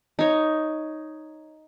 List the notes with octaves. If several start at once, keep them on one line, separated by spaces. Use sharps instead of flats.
D#4 C#5